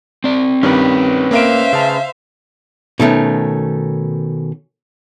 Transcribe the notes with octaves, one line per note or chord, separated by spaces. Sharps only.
C4 D5
G2 D#3 C#4 G4 B4
A#3 A#4 C5 E5 F5 D7
C#3 A5
B2 D#3 A3 C#4